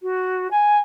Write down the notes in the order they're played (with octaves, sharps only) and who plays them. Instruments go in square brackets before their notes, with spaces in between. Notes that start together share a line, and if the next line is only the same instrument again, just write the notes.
[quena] F#4
G#5